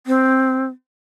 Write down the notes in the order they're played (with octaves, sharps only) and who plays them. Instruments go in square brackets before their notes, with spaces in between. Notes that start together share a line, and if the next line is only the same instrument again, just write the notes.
[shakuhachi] C4